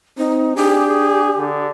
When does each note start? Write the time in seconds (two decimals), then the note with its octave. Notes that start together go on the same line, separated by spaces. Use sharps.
0.18 C4 D#4
0.56 D4 G4 G#4
0.87 G#4
1.38 D3